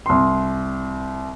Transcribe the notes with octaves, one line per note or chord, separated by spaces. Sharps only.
C2 C6